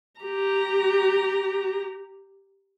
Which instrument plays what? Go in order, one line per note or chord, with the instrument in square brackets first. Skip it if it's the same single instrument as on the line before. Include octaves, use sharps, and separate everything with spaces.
[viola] G4 A#5